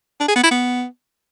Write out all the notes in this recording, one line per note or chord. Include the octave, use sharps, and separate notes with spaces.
D4
G#4
B3
E4
B3